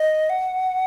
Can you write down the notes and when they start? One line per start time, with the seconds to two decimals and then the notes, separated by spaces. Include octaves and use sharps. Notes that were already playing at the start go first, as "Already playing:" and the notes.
Already playing: D#5
0.29 F#5